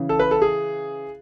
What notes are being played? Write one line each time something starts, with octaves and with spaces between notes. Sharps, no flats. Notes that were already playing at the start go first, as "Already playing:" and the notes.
Already playing: C#3 E3
A4
B4
A4
G#4